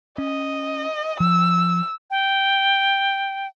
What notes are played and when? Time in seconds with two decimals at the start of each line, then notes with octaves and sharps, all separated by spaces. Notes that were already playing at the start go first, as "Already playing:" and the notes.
0.18 C#4 D#5
1.20 F3 E6
2.11 G5